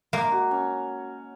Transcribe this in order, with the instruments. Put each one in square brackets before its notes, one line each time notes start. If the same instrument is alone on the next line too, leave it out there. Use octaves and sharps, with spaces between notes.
[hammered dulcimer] G#3 [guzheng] A#3
[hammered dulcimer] F#4
C#4